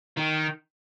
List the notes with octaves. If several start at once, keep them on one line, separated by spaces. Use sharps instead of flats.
D#3